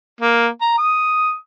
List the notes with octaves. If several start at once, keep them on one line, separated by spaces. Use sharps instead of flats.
A#3
A#5
D#6